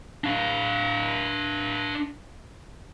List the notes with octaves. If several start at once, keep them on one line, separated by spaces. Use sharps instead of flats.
D4 F5